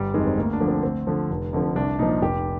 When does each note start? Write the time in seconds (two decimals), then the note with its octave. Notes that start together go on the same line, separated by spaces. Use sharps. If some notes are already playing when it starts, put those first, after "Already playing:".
Already playing: G1 G3
0.14 F2 D#3 G#3
0.27 C4
0.37 D2 A#3
0.53 D4
0.60 D3 F3
0.68 C4
0.83 D2 C4
1.07 D3 F3
1.30 F1
1.53 F2 D3 F3
1.76 C2 D4
1.99 A#2 F3 D#4
2.22 F1 G4